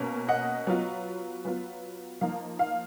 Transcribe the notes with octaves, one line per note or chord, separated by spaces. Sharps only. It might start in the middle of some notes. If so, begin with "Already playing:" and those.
Already playing: B2 A#3 C#4
D#5 F#5
F#3 B3 F4
F#3 B3 F4
F3 A#3 D#4 F5
F5